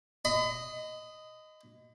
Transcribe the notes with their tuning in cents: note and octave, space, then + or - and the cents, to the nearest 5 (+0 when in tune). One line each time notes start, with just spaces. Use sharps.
D#5 +0 B5 +40